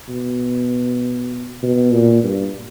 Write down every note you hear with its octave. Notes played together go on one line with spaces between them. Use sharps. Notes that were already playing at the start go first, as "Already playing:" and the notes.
B2
B2
A#2
G2